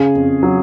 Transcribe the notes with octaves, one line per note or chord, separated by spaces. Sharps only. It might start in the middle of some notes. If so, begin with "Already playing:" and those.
Already playing: C#3 G#4
F2
F#3